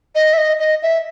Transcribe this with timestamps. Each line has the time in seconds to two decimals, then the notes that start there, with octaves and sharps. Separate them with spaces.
0.15 D#5
0.33 E5
0.38 D#5
0.59 D#5
0.82 E5